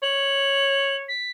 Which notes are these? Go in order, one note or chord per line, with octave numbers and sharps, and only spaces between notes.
C#5 F#7
B6